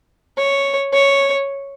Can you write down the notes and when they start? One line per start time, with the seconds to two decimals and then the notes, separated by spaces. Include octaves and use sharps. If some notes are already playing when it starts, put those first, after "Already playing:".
0.37 C#5
0.93 C#5